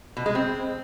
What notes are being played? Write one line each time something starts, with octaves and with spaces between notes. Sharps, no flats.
B2
G#3
C4